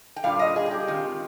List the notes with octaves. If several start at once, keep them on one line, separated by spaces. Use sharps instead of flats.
G5
A#2 G3 D4 F4 F5
D#5
G#4
G#4
G4
D#3 G#3 C4 F4